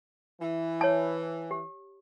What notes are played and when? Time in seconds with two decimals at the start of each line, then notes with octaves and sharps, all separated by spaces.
0.41 E3
0.81 C#5 A5
1.51 G4